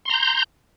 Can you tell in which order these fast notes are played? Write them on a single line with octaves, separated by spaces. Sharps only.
C6 A#5 G6